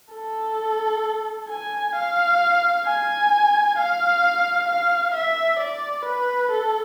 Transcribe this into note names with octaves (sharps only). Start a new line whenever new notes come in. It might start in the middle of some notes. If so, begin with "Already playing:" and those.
A4
G#5
F5
G#5
F5
F5
E5
D5
B4
A4